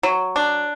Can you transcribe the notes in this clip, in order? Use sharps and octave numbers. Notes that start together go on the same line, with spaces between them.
F#3
D4